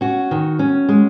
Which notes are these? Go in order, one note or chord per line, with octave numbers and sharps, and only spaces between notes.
C#4 F#4
D#3
C#4
G#3